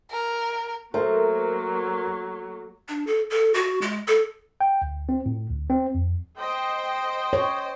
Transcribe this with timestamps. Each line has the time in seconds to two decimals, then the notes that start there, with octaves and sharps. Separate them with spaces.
0.11 A#4
0.94 F#3 A3 A#3 A#4 C5
2.89 D4
3.07 A4
3.30 A4
3.54 F#4
3.82 G#3
4.08 A4
4.61 G5
4.82 D2
5.09 C4
5.26 A2
5.50 D2
5.70 C4
5.95 F2
6.40 C5 D#5 G5
7.33 C#5